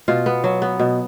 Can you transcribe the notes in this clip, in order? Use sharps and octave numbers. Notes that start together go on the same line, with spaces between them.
B2 F4
B3
F#3
B3
B2